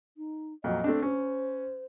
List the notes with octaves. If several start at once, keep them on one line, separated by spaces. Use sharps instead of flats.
D#4
F2 A#2 F#3 D#5
A3 C4 D4
C#4 C5